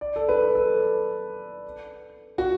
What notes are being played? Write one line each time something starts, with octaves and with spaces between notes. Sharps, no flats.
D5
A4
B4
A4
F#4